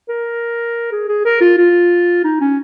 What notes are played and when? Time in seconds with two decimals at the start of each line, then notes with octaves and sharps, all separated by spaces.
0.09 A#4
0.92 G#4
1.09 G#4
1.25 A#4
1.41 F4
1.58 F4
2.24 D#4
2.41 C#4